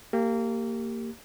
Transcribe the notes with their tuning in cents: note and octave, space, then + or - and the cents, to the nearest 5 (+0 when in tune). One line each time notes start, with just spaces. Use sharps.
A#3 -20 G4 +0